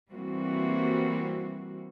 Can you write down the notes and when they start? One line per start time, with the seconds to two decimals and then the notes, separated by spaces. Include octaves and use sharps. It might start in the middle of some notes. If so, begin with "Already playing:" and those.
0.12 E3 G3 A#3 C4 F#4